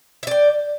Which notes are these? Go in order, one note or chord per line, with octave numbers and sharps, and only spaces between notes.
D5 E5 G5